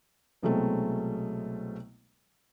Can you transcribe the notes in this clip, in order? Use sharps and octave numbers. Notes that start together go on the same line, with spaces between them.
C2 B2 F#3 G#3 A3 C4